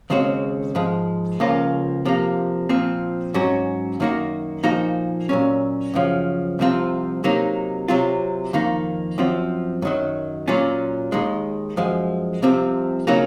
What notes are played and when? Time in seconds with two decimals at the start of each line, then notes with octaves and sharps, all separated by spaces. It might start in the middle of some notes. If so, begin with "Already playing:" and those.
0.10 D#2 C#3 G#3 C4 F#4
0.75 G#2 F3 G#3
1.40 C#2 C#3 F3 A#3 F4
2.05 C3 F3 A#3
2.69 A#2 F3 C4
3.34 G#2 F#3 C#4 F#4
4.00 F#2 D#3 A#3 D#4 F#4
4.63 A#2 F3 A#3 D#4 F#4
5.29 A#2 F#3 C#4
5.94 F#2 C#3 F3
6.59 C2 C3 F3 C4 F4
7.24 C3 F#3 A#3 D#4
7.88 C3 F#3 C4 F4
8.53 F2 D#3 A#3 D#4
9.18 F#2 F3 C4 F4
9.82 F#2 D#3 F#3
10.48 A#2 F#3 C#4 F4
11.12 D#2 D#3 G#3
11.77 F#2 F3 G#3
12.42 C2 C3 F3 C4
13.07 C#3 F#3 A#3 D#4 F#4